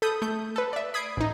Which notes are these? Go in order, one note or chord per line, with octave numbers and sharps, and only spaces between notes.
A4 B5 D#6 G6
A3 G6
A4 B4
D5 E5
B5 D#6 G#6 C7 D7
A1 D#4